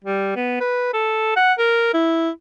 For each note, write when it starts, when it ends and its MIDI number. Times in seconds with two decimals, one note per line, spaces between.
0.04 0.33 55
0.36 0.56 59
0.61 0.91 71
0.94 1.32 69
1.36 1.53 78
1.59 1.89 70
1.94 2.30 64